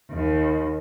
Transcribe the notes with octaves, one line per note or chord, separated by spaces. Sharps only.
D#2